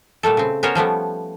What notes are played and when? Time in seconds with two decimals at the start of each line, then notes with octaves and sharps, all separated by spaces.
0.23 A#2 G3 A3 A4
0.37 C#3 C4
0.63 B3 C#4 A#4 C5 C#5
0.75 F3 G3 A3 B3